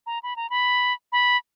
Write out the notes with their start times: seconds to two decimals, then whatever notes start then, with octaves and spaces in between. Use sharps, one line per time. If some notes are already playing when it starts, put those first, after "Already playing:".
0.06 A#5
0.23 B5
0.36 A#5
0.50 B5
1.12 B5